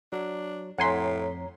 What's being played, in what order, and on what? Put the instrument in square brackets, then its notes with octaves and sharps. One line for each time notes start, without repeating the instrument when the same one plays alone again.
[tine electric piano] F#3 [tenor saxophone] D4
[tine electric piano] F2 B6 [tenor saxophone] A2 [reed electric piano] C#5 A#5 [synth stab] F#5 G#5 C6